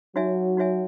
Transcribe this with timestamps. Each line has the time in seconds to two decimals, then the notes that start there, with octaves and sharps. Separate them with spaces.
0.15 F#3 D#4 F#4 C#5 E5 G#5
0.57 D#4 F#4 C#5 E5 G#5